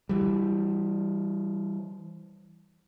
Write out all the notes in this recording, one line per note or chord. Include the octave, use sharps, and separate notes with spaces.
E3 G3